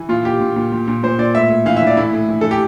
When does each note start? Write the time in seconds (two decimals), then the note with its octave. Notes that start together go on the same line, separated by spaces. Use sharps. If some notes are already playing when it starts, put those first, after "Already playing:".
Already playing: E3
0.09 A#2 F4
0.25 A#2 G4
0.40 A#2
0.56 A#2
0.72 A#2
0.88 A#2
1.03 A#2 C5
1.19 A#2 D5
1.34 A2 E5
1.50 A2
1.66 E3 F5
1.77 E5
1.82 E3 D5
1.97 A2 E4
2.13 A2
2.29 E3
2.41 E3 A4
2.51 G4